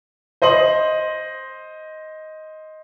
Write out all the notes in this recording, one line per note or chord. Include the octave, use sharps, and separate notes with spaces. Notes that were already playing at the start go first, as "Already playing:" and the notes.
C5 D#5 C6 F#7